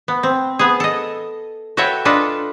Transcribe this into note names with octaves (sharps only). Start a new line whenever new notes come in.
B3
C4
B3 G#4
A4 D#5
F#4 A4 B4 C#5 E5 G5
D4 F4 A4 B4 D#5